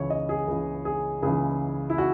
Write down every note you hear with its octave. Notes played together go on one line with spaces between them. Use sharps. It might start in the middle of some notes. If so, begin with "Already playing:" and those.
Already playing: C#2 C#3 E3 C#5
D#5
G#4
C#2 C#3 E3
G#4
C#2 C#3 E3 G#4
E4
F#4